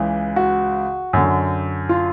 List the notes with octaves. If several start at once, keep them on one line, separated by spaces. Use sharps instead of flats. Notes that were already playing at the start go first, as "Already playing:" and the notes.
Already playing: C#2 C#3 E3
F#4
F#2 D3
F4